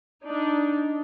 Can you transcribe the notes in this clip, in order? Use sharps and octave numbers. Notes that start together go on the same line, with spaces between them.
D4 D#4